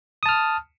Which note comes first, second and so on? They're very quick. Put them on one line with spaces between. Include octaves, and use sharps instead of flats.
D#6 A5 F6